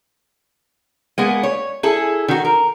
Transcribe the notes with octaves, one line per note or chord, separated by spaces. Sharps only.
G#3 A#3 B3
C#5
E4 G#4 A4
D#3 F#4
A#4